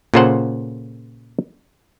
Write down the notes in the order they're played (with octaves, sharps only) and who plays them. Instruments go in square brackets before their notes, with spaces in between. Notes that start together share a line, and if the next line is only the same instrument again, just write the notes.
[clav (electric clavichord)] A#2 C#3 F4 A4 C5 F#5